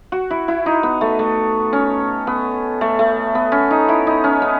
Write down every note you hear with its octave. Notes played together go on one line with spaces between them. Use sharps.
F#4
E4
E4
D#4
B3
A3
A3
C#4
B3
A3
A3
B3
C#4
D#4
E4
D#4
C#4
B3